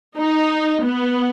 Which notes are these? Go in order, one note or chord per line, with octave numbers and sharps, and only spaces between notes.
D#4
B3